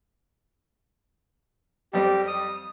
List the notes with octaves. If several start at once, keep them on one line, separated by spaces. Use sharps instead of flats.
F2 G3 C4 G4
D#6